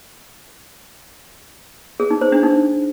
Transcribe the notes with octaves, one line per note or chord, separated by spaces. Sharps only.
G#4
D#4
C5
D4
D#4